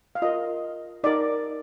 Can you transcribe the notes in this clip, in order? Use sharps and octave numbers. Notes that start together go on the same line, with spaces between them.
F5
F4 A#4 D#5
D#4 A#4 D5